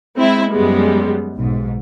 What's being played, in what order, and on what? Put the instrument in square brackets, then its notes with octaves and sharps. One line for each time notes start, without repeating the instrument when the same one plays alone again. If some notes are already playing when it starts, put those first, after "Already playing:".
[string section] G#3 C4 E4
F#2 G3 G#3 B3
B1 G#2